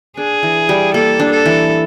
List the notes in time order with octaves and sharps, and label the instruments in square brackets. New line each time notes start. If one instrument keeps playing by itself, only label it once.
[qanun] D4 [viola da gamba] G#4
[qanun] E3
G3
[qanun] A#3 [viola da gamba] A4
[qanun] D4
[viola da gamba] A4
[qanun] E3